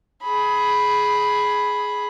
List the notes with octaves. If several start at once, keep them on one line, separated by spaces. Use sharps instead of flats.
G#4 B5